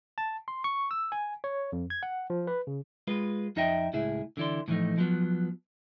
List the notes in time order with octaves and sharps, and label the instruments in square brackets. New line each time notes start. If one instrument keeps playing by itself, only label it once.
[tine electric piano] A5
C6
C#6
E6
G#5
C#5
F2
G#6
F#5
F3
B4
C#3
[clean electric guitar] G#3 F4 B4
F2 D#4 D#5 E5 G5
C#2 A2 E4 G#4 E5
D3 E3 E4 D5 C6
A2 D3 E3 F3 A3 D#4
F3 F#3 B3